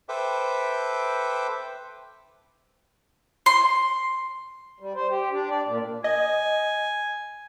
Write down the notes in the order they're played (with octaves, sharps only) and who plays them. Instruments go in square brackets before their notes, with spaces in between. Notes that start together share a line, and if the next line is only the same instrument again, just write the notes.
[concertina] A4 B4 C5 E5 G5 D6
[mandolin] C6
[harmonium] G3
C5
G4
D4
D5
A#2
[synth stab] D#5 [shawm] G#5